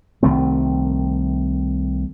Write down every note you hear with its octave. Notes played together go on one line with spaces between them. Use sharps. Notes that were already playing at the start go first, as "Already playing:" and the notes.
C2 D#3 A3 C4